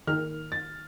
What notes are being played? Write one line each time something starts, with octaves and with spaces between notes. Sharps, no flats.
D#3 F6
A6